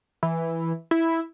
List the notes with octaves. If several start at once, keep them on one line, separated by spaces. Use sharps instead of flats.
E3
E4